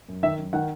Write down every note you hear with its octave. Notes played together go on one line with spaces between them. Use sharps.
F#2
D#3 E5
F#2
D#3 F#5